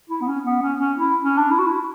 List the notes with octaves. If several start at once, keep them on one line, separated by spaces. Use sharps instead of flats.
E4
B3
C#4
B3
C#4
C#4
E4
C#4
D4
E4
F#4
E4